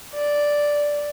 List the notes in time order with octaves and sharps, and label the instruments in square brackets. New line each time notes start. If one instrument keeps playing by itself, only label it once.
[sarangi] D5